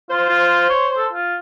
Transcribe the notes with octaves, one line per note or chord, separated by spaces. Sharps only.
F4 C5
F4
C#5
A4
F4